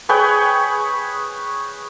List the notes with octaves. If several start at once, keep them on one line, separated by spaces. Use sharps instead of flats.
G#4 B4 C#5 G5